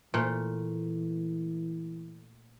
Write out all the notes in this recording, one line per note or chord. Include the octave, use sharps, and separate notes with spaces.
A#2 E3 A3